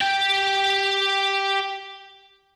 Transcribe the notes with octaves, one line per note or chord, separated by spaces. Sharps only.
G4 G5